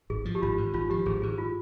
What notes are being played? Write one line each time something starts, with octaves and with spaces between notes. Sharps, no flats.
G#1 G#4
F3
G4
G#1 F4
G#2
G#1 F4
F3 G4
G#1 G#4
G#2 G#4
F4